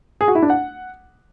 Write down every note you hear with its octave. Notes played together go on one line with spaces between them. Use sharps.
G#4
F#4
E4
D4
F#5